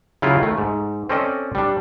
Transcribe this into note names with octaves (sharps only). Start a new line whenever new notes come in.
C#3 F#3 E4 F4
D#3 A3
G#2
C4 C#4 A4 D5 D#5
G3 D4